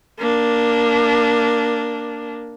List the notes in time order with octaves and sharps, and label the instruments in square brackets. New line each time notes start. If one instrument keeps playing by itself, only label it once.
[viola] A#3 D4